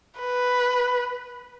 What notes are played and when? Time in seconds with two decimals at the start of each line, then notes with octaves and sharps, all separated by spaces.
0.20 B4